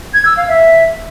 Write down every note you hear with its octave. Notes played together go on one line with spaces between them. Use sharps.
G#6
E6
F5
E5